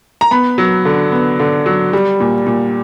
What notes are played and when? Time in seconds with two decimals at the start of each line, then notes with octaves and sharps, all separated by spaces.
0.21 A#5
0.31 B3 B5
0.58 F#3
0.85 D3
1.12 B3
1.39 D3
1.66 F#3
1.93 G3
2.20 A#2
2.47 A#2